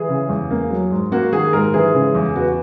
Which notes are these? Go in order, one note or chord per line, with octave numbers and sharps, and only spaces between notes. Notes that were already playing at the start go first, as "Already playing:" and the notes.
Already playing: E3 G#4
C#3
E2
A#3
F#3
G#2
A#3 F#4
D#3 G#4
G#2 A#4
E3 G#4
C#3
E2
B3 F#4